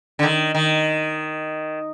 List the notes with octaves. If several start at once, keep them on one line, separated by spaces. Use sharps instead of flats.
D3
D#3
D#3